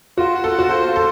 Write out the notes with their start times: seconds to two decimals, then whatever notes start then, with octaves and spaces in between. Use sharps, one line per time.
0.18 F4 F#4
0.34 F#5
0.44 A4
0.52 F4
0.59 F#4
0.69 A4 C5
0.86 F4
0.96 A4